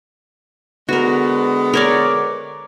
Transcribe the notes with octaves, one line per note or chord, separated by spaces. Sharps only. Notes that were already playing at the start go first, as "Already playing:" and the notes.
D3 G#3 B3 F#4 A#4
A#4 C#5 D5